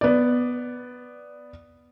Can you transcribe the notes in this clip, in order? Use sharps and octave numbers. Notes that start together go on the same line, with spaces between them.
B3 D5